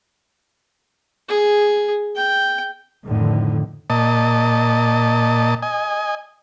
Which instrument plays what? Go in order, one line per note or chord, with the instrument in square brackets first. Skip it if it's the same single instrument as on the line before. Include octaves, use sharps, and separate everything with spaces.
[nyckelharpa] G#4
G5
[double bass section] F2 A2 D3 D#3
[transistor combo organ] A#2 D#5 A5
D#5 G#5